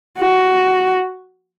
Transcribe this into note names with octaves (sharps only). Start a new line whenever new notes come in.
F#4